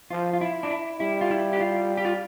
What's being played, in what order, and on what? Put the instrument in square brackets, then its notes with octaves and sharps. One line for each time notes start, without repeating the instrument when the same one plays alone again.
[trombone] F3 [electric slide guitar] F4
[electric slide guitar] F4
E4
D4
E4
[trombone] G3 [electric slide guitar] E4
[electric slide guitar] F4
E4
G4
F4
G4
F4